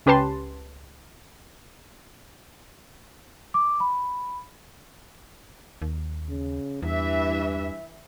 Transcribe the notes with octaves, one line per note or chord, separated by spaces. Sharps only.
C#2 C#4 G4 B4 A5 C6
D6
B5
D#2
C#3
E2 G2 E3 E5